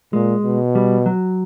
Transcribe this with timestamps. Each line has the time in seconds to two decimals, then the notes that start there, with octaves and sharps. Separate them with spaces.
0.13 A#2 G#3
0.44 B2
0.75 G3
1.06 F#3